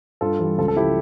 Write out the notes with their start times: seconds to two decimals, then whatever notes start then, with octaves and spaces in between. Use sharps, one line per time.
0.21 G2 F4 A4
0.39 E3 G3
0.58 C#2 F4 A4
0.68 A4
0.76 C#3 F3 E4 G4